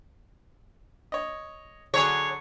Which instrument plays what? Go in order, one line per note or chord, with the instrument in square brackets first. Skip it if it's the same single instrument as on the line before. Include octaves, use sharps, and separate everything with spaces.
[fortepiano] C#5 D#5
[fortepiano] D3 F#3 G#4 [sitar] C#5